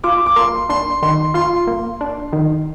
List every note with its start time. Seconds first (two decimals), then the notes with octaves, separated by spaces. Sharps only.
0.04 F4 D6
0.26 D6
0.36 A#3 C6
0.69 D4 C6
1.02 D#3 C6
1.34 F4 C6
1.67 A#3
2.01 D4
2.33 D#3